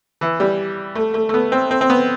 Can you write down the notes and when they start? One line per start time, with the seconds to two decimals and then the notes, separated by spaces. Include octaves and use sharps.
0.21 E3
0.40 G3
0.95 A3
1.14 A3
1.29 A3
1.34 B3
1.52 C4
1.71 C4
1.81 C4
1.90 B3